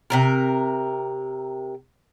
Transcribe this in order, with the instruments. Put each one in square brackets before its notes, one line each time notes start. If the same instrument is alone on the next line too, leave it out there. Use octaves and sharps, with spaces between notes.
[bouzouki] C3 D#3 A#4